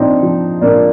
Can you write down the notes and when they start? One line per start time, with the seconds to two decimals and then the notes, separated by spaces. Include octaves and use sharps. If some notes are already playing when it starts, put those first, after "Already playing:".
Already playing: A#2 F3 C4 D4 D#4
0.23 F3
0.61 A#2 A#3 D4